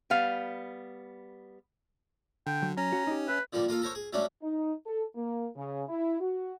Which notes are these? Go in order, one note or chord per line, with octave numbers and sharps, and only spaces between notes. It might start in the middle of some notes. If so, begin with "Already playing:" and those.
G3 B3 F5
D3 G5
F#3
C#4 A#5
F#4
D#4 G4
B4 E5
D3 F3 G3 A#3
A#3 F4 A4 F5
A4 A#4 C5 C#5
G#4
F#3 G3 A3 C#4 D4
D#4
A4
A#3
C#3
E4
F#4